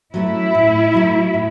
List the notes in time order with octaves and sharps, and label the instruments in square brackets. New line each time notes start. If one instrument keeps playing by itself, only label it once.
[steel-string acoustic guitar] F#3 A3 C#4 [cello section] E4
[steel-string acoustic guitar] A2
F#3 A3
A2